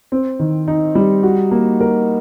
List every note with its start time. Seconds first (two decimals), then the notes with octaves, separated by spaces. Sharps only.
0.12 C4
0.40 D#3
0.68 D#4
0.95 G3
1.23 F#4
1.51 A#3
1.80 A#4